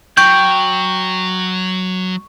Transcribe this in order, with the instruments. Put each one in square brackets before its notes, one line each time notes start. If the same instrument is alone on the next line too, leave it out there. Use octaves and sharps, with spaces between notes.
[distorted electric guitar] F#3 [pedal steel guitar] G5 [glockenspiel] C#6